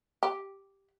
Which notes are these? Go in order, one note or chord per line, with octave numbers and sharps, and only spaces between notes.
G4